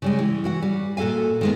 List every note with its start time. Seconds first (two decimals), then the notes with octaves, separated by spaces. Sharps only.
0.02 C#3 G3 G#3
0.19 E3
0.44 E3 F#4 F#5
0.62 G3
0.97 A#2 F#4 A4 F5 G#5
1.41 D#3 G#3 B3